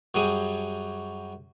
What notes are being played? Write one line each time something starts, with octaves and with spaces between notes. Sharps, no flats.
F#2 F#3 G3 G#4 G#5